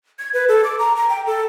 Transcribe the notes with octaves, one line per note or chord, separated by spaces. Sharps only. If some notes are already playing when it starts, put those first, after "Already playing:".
G#6
B4
A4
D6
A#5
A#5
G5
A4